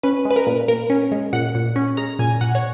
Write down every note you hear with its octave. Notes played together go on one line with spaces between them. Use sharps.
C#4 B4
G#3
B4
A#4
A#2
A#2 A#4
C#4
G#3
A#2 F#5
A#2
C#4
G#3 A#5
A#2 G#5
A#2 F#5
C#5